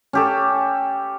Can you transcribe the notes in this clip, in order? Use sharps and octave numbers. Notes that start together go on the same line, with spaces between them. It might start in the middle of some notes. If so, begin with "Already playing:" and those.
C#4 G4 A4